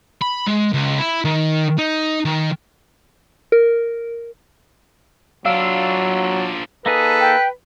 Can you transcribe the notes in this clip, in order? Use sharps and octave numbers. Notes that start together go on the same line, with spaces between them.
B5
G#3
C#2
E4
D#3
D#4
D#3
A#4
F#3 D4 F4 F5 E6
A#3 D#4 G#4 A4 B4
G5